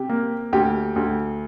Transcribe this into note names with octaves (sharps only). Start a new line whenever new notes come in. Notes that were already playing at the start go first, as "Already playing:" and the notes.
Already playing: C3 G4
A#3
D2 G4
D2